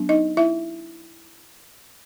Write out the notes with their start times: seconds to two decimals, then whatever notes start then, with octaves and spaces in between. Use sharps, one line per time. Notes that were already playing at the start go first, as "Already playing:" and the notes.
Already playing: F#3 B3 D4
0.09 D#4 D#5
0.37 E4 E5